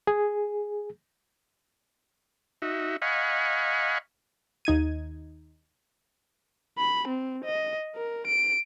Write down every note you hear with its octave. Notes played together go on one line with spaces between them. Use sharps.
G#4
D#4 F#4 E5
D#5 F5 F#5 G#5 B5 C#6
D#2 D#4 G#6 D#7
B5
C4
D#5
A#4
D7